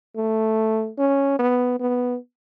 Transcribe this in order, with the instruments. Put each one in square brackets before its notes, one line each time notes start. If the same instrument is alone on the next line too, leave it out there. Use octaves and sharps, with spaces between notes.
[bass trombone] A3
C#4
B3
B3